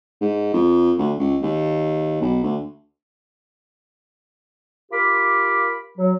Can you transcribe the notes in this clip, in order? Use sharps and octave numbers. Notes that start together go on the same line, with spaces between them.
G#2
F2
D2
C#2
D#2
B1
D2
F4 G4 A#4 B5 D6
F#3